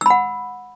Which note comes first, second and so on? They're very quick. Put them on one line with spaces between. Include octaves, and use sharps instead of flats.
E6 B5 F#5